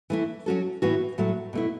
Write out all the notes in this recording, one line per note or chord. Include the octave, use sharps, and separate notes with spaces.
E3 A3 E4
F#3 C#4 F#4 A4
A2 E3 B3 F#4
A2 F#3 A3
B2 A3 E4